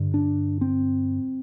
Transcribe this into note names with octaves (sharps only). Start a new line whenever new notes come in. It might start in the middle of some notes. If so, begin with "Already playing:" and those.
Already playing: G2 D3
D4
C4